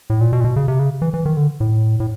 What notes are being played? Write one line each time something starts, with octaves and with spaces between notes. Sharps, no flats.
A2
A#2
B2
A#2
B2
C#3
C3
C#3
E3
E3
D#3
D3
A2
A2